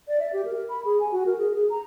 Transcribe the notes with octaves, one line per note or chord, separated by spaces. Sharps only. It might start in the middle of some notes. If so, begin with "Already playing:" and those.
D5
E5
G4
A#4
B5
G#4
G#5
F#4
A#4
G#4
G#4
A#5